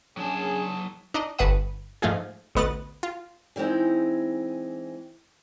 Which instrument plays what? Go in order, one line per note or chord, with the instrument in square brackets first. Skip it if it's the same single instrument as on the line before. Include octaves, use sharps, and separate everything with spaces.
[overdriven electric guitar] F#3 A5 [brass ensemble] C#4 D4 G#4
[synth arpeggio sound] D4 D#4 D#5
G1 B4 E5 F#5 D#6
G#2 F3 A3 F4 G#4
A1 D2 B3 D#5 F#6 A6
F4
[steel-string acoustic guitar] E3 G3 G#3 C4 D#4